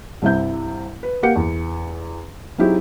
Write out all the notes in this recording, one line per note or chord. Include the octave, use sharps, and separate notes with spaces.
C2 G2 C3 E4 E5 G6
B4
A#3 G4 A#4 F#5 C#7
E2
F#3 C4 D#4 E4 G4 G#4